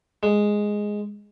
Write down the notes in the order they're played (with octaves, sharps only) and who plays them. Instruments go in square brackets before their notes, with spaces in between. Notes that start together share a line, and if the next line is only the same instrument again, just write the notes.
[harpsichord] G#3